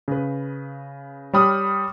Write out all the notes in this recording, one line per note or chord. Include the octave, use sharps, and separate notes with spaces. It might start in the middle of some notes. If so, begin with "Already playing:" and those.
C#3 B4
G3 C#5 G5 B5 D#6 F6